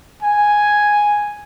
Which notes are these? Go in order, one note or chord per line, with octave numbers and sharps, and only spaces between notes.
G#5